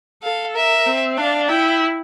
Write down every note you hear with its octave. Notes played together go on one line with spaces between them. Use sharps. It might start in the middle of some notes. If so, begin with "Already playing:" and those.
A4 F5
A#4 E5
C4
D4 F5
E4 G5